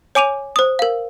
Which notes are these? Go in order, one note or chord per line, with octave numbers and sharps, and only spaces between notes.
C#5 G#5 D6 D#7 F7
C5 D#6
A#4 F5